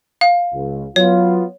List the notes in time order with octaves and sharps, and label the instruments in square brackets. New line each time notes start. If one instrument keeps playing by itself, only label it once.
[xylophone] F5
[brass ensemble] C#2
[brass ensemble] F#3 B3 F4 [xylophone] C#5